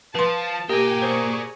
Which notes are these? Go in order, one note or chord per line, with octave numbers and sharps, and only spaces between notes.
F3 B4 A5 C6
A#3 G4 A#4 D5 G5 G#5
G#4 C5 C#6